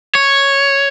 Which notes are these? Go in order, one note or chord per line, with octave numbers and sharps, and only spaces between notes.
C#5